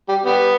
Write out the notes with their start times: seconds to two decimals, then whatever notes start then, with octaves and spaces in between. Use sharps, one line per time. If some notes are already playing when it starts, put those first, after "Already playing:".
0.08 G3
0.26 G3 B3